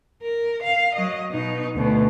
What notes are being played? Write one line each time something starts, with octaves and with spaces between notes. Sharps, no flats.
A#4
F5
F#3 D#5
B2 D#4
D2 B2